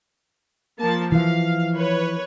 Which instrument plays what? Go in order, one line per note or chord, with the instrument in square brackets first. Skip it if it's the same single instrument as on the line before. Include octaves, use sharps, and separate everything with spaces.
[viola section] F3 A#3 A5
[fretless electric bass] E3 F3 [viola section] F5
[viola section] B4 C#5